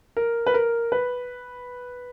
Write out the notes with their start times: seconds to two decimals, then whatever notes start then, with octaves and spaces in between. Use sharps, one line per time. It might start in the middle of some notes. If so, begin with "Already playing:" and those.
0.17 A#4
0.47 B4
0.54 A#4
0.92 B4